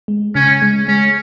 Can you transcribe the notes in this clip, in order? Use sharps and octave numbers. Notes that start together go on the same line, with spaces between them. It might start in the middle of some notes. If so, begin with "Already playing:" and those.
G#3
C#3 C#4
G#3
G#3 C#4